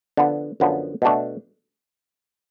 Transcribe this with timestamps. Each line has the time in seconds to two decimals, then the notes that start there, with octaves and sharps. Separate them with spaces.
0.17 D3 F3 B3 D4
0.60 F#2 D3 F3 B3
1.02 B2 A3 D4